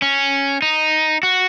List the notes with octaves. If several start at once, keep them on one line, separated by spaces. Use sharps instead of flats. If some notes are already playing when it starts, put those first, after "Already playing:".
C#4
D#4
F#4